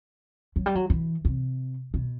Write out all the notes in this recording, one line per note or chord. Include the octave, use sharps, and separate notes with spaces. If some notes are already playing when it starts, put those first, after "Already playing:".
F#3
G3
F#3
E3
C3
B2